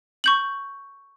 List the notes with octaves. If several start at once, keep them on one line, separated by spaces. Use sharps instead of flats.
C#6 G6 F#7